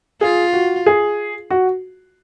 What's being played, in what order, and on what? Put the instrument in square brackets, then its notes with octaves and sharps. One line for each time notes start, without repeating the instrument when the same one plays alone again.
[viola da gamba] F4 [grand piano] G#4
[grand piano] F#4
G#4
F#4